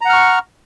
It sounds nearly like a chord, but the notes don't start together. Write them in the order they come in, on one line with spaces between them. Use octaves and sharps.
A#5 F#5 F6 C#6